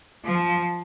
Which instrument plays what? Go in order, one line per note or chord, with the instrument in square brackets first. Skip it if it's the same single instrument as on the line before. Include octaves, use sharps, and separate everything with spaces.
[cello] F3